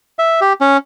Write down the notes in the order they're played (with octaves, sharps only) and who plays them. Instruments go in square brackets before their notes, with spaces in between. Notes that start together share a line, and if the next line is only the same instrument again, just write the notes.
[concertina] E5
G4
C#4